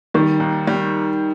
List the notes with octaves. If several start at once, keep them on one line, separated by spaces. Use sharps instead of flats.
D#3 G3
D#2
G3